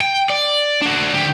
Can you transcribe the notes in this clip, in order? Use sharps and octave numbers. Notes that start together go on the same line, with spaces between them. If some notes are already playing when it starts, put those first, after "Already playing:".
G5
D5
D4 F#4
D2 G4